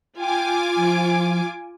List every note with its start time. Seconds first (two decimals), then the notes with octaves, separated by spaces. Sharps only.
0.19 F4 G5 G#5 D6
0.76 F3